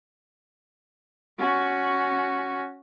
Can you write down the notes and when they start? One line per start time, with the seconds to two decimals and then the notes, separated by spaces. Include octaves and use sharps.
1.38 C#4 F#4